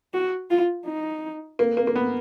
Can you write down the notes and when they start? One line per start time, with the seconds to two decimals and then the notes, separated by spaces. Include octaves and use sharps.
0.14 F#4
0.51 F4
0.86 D#4
1.59 A#3
1.77 A#3
1.87 A#3
1.96 B3